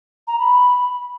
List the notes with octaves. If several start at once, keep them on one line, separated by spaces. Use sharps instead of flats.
A#5
B5